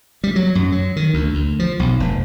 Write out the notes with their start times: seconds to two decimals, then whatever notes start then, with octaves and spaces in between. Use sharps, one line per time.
0.24 G3
0.36 F#3
0.55 F#2
0.72 F#3
0.96 D#3
1.14 D2
1.34 D2
1.59 F3
1.79 B1
2.00 F1